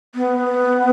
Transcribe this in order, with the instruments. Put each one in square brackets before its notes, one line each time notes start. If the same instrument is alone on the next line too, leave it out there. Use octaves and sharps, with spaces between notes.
[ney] B3